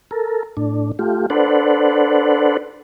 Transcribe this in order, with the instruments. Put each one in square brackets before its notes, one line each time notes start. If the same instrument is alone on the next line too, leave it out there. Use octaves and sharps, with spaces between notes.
[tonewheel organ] A4 A#4
A2 D4
A3 F4 G4
D4 A4 B4 C5 D5 F#5